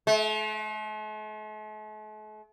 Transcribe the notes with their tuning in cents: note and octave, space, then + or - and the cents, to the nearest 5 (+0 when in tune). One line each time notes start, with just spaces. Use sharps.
A3 -45